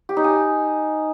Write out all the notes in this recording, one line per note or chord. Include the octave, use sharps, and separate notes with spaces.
G4
D#4
G#5